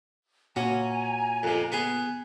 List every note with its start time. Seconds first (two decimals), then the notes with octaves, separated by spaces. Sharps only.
0.56 A#2 C#4 F#4 G#5 A#5
1.43 F2 C3
1.72 B3 G#4